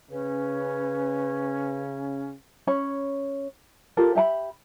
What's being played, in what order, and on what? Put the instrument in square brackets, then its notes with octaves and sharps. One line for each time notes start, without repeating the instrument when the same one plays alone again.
[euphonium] C#3 [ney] C#4 [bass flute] B4
[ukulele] C#4 C#5 B5
F4 G4 A4 A#4
G4 E5 A5 B5